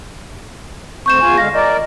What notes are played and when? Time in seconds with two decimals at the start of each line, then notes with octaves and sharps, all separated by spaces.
1.06 D2 C4 C#6 G6 E7
1.22 E2 F4 G#5
1.38 D3 G#3 F5 A#6
1.54 A#4 D5 D#5